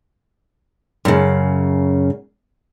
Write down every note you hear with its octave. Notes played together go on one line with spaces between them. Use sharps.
F#2 C#3